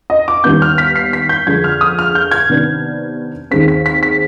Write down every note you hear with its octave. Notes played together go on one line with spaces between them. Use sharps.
D#5
D6
D#2 D#3 G3 B3 G6
F6
B6
C7
B6
G6
F2 D3 F3 G#3 G#6
F6
D#6
F6
G6
G#6
C3 D#3 B3 D4
D#2 D#3 G#3 C4 B6
B6
B6
B6